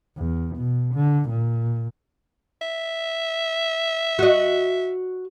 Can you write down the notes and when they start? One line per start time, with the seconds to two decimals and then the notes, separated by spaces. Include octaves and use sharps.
0.17 E2
0.57 B2
0.95 D3
1.29 A#2
2.62 E5
4.19 F#4 D#5